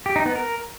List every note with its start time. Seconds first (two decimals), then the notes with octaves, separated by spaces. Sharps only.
0.06 G4
0.16 D#4
0.26 B3
0.36 A#4